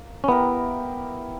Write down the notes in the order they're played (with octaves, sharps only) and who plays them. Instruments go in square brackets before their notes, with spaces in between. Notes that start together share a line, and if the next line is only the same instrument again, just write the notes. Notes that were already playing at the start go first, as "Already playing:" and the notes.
Already playing: [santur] A#3
[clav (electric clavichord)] C#4
[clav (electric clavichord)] B3 [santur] E4 G4 A#4